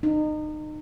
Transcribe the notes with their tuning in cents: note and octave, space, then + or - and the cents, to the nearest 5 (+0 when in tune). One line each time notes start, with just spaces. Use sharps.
D#4 -30